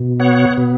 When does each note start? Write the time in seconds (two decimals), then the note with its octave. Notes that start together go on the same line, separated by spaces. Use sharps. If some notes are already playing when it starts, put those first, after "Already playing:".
Already playing: B2
0.20 B3 C#5 F#5
0.58 B2